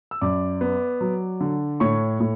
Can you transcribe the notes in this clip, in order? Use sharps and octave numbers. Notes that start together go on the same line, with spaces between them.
E6
F#2 D5 D6
B3
F#3
D3
A2 C#5 C#6
A2